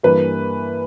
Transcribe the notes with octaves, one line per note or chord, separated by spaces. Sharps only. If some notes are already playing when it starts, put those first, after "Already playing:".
G2 E3 A#3 B4